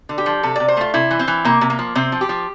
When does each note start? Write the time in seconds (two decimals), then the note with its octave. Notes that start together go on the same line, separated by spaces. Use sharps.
0.09 D3
0.18 G4
0.26 F3
0.43 C3 A4
0.56 C3 D5
0.68 C5
0.77 A3 F4
0.94 C3 E4
1.11 E3
1.19 C4
1.28 E3
1.45 C3 A#3
1.61 C3
1.70 A#3
1.79 F3
1.95 C3 C4
2.12 F3
2.21 G4
2.29 F3